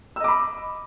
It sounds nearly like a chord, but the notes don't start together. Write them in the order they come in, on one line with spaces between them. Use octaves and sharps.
E6 D#5 D6 B5